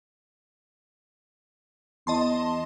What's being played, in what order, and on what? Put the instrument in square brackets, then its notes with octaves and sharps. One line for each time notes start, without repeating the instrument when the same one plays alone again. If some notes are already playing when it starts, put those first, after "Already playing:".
[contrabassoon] E2 [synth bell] D#5 A5 C6